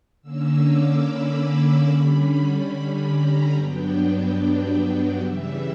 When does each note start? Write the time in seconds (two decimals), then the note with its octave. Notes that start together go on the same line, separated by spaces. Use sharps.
0.22 D3 A#3 C#4 E6
0.63 D6
1.04 B5
1.87 D3 G3 C#4 B5
2.30 B5
3.12 A#5
3.53 G2 F#3 B3 D4 G5
5.19 C#3 E3 G3 E5